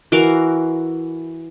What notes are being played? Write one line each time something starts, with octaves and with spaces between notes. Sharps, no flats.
E3 F#4 A#4 F5